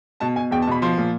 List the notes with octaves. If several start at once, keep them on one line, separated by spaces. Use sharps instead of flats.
B2 A5
B2 G#5
E2 G5
A5
B2 B5
F3 C6
A#2